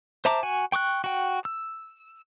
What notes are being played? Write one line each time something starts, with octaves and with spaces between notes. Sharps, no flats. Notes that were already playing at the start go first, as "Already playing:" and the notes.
C5 E5 A5 A#5 D6
F#4 G#5
G5 C#6 D6 F#6
F#4 G5
E6